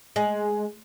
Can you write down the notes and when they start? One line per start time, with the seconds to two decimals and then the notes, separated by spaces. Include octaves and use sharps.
0.16 G#3